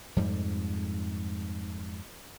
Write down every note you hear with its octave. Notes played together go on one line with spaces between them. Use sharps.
F2 G#2 G3